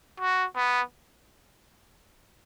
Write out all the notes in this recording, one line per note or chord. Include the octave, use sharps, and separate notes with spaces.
F#4
B3